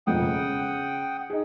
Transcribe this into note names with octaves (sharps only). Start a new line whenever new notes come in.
E1 F2 F#5 G5 D#6
C#3
D#4 G#4